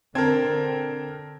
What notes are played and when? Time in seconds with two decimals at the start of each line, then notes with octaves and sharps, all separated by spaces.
0.15 D3 C4 A#4 A5 G#6